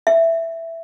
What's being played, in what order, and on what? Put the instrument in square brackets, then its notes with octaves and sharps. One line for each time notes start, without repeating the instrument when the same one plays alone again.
[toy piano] E5